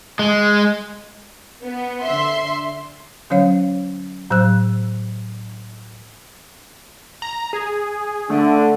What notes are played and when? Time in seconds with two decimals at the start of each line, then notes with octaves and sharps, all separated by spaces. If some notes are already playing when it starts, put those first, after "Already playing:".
0.19 G#3
1.62 B3
2.03 D3 E5 C6
3.30 D3 F#3 C#4 C#5 F5
4.30 A2 F#3 C5 E6 F#6
7.22 A#5
7.53 G#4
8.30 D3 A3